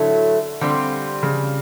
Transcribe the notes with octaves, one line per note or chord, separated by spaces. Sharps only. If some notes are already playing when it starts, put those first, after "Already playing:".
Already playing: A2 D3 F#3 A3
D3 G3 C4 F4
C#3